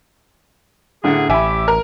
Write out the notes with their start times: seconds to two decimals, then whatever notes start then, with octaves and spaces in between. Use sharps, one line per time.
1.04 A1 D3 G#4 F#5
1.30 A1 G4 E5 G#5 B5
1.68 A#4